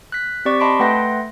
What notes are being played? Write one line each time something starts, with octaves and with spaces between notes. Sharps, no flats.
F#6 B6
C4 G4 D5 C#6 D6 B6
D#5 A5 B5 C6 B6 D7
A3 B4 F#5 G5 C6 A#6